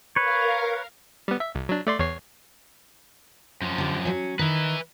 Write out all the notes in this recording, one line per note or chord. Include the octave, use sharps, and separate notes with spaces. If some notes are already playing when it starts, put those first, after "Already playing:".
A#4 B4 C#5 F5
G3 B3
E5
C2
F#3 D4
A3 D5 C6
E2 C#5 C7
F#2 F3
D3 G4
F#3 C#4
D#3 D#4 B4 E5